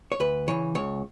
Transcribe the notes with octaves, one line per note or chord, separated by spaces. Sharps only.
C#5
D2 B4
C#3 E3 C#5
C#2 C#5